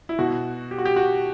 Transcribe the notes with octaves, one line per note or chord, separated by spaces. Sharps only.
E4
B2 F#4
G4
F#4
G4
F#4